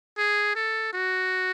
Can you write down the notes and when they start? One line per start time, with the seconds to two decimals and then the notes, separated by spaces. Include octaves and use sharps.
0.17 G#4
0.55 A4
0.93 F#4